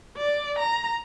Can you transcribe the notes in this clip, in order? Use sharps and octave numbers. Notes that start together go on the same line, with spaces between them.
D5
A#5